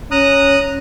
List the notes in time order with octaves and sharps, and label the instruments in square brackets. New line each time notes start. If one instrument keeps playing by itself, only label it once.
[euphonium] C#4 [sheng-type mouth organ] A#5 D#6 F#6